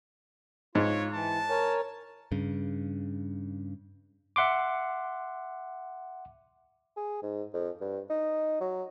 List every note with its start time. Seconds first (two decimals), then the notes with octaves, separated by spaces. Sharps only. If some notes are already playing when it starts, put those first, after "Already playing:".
0.75 G#2 F4 C#5
1.12 E3 A5
1.50 A#4 C#5 G#5
2.32 G2 C#3
4.36 E5 F#5 C6 D6
6.97 G#4
7.23 G#2
7.53 F2
7.81 G2
8.10 D#4
8.61 F#3